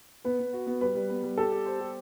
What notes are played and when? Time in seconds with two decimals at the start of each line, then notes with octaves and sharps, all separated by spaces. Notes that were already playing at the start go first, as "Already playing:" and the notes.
0.25 B3 B4
0.39 B3
0.53 F#4
0.67 B3
0.81 G3 B4
0.95 G3
1.10 B3
1.24 G3
1.38 G4 A4
1.52 G4
1.66 C5
1.80 G4